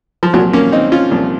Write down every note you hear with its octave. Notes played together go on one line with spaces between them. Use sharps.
F3
C2 A#2 F3 F#3
A#3 C#4
C4 D#4
C#4 F4
C2 A#2 F3